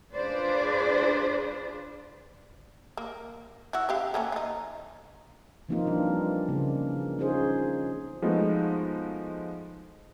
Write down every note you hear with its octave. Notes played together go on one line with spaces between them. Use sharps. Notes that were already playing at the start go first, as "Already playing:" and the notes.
D4 F4 G#4 B4 C5 D5
A#3
E4 F#4
C#3 G4 F5
A3 A#3 C#4
D#4 F4
E3 F3 A#3 C4 D#4 F4
E3 G3 C4 D4 F4
C#3 A#3
C#4 D#4 F4 G#4 C5
F3 G#3 A3 B3 D#4 F#4